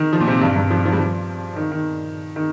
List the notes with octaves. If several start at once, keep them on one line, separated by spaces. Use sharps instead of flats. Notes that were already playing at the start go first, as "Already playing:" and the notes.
Already playing: D#3
F3
A#2
C3
G2
G2
F3
F3
G3
F3
D#3
D#3
D#3